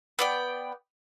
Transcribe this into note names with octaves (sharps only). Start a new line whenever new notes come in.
B3 D5 G5